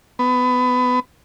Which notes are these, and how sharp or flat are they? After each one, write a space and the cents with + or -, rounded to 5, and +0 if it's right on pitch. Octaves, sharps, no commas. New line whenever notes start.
B3 +20